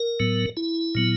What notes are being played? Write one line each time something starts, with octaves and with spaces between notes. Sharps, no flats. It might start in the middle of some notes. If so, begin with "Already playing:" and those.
Already playing: A#4
A2 F#3 B3
E4
A#2 F#3 B3